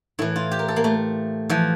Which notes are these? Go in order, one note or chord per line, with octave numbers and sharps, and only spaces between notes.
A2 E3 E4
F4
G4
A#4
A4
A#3
A3
E3 F3